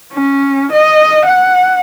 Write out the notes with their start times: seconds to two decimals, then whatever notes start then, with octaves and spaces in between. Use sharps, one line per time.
0.13 C#4
0.72 D#5
1.26 F#5